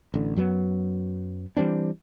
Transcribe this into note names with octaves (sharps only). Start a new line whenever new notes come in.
A1 D3
F#2 F#3 G3 B3
E3 G3 C4 D4